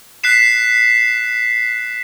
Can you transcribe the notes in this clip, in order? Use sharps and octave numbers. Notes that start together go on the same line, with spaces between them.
F#6 B6 C7 E7